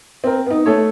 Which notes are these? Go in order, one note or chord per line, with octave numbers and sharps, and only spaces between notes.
C4 A#4
B3 D#4
A3 A4 C#5